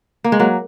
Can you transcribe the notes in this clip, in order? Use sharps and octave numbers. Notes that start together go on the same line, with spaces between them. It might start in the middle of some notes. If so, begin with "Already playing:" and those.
A#3
G#3
F#3 A#3